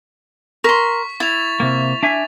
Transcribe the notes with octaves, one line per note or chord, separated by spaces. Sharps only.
A#4 C6 C#6 B6
E4 A6 F7
C3 A#3
D4 E5 G#5